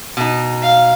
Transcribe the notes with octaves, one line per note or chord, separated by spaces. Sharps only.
B2 D#4
F5